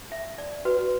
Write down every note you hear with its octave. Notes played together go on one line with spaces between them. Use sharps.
E5
D5
F#4 B4